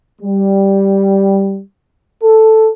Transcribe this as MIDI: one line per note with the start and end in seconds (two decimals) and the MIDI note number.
0.22 1.60 55
2.23 2.69 69